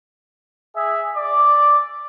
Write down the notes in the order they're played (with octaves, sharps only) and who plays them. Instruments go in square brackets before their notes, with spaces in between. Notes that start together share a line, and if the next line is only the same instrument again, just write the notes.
[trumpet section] G#4 E5
D5 D6